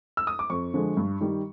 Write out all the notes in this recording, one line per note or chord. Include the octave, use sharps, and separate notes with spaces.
E6
D#6
D6
F2 C#6
D3 F3 G#3
G2
D#3 G3